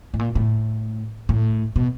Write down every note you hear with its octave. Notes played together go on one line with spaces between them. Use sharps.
A2
A#2
A2
A2
B2